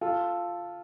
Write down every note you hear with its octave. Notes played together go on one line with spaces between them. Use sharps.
F4 A4